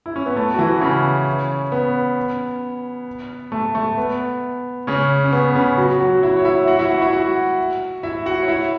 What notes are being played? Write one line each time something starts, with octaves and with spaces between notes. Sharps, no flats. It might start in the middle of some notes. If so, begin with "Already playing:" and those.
E4
C#4
B3
A3
F#4
E3 E4
C#3 C#4
B3
A3
A3
B3
C#3 C#4
C#4
B3
C#3 C#4
F#3 F#4
F#3 F#4
E4 E5
C#5
E4 E5
F#4 F#5
E4 E5
F#4 F#5
E4 E5
F#4 F#5
E4 E5
F#4 F#5
C#5
E4 E5